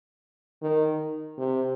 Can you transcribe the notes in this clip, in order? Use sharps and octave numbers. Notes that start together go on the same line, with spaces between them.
D#3
C3